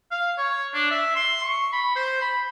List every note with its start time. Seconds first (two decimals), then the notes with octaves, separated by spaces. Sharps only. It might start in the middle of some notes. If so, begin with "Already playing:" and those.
0.11 F5
0.38 C#5
0.73 D4
0.91 E5
1.15 C6
1.43 C#6
1.72 B5
1.95 C5
2.21 B5